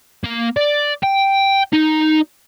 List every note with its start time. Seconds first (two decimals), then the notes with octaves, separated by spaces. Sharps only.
0.24 A#3
0.57 D5
1.03 G5
1.73 D#4